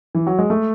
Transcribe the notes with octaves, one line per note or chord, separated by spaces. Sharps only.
E3
F#3
G#3
A3